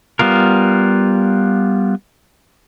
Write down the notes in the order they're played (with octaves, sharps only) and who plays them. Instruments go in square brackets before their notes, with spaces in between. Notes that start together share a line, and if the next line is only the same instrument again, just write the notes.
[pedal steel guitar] G3 B3 F4 A#4